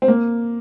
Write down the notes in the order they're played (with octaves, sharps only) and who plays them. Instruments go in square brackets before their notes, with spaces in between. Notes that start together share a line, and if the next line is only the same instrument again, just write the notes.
[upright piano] C4
A#3